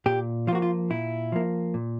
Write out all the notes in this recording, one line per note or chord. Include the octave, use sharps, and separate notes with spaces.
A#2 G4
F3 F4
A#3 F#4
F4
A#2 E4
F3 A#3
A#2